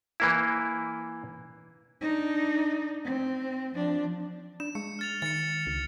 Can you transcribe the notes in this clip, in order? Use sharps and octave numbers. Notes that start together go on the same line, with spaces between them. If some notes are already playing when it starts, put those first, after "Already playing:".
E3 A#3 E4
D4 D#4
C4
F3 D4
D4 E7
G#3 C#7
F6 A6 F7
D#3 A6 C#7
C#2